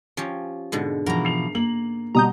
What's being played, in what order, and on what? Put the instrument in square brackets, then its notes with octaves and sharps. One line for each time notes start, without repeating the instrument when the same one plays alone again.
[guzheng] F3 C#4 G4
G#2 B2 D3
[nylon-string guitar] B2 E3 F3 [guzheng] A#4 A#5
[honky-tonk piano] C7 F7
[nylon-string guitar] A#3 [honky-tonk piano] F#7
[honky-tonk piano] B2 G3 [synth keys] A#5 D#6 G6